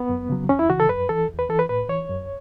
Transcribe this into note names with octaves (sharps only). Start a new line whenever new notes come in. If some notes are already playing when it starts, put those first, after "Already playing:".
Already playing: B3
F#2
C#3 F#3
E2 C#4
E4
C#3 E3 F#4
A4
F#2 B4
E3 A4
E2
B4
E3 A4
B4
A2 B4
E3 C#5
F#2